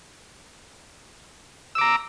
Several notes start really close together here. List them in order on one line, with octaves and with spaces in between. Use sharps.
E6 D6 A#5